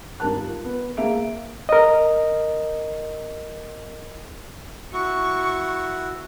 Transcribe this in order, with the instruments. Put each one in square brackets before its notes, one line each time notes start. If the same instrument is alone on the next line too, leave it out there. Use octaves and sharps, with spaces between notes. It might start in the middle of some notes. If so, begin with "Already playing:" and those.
[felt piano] G#1 G3 A#4 A5 F#6
F4
B3
A#3 G#4 E5 D7
[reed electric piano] A#4 D#5
[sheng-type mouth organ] E4 F#4 [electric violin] C#6